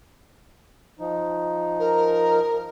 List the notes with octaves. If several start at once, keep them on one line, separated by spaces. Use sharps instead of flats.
F3 D#4
A#4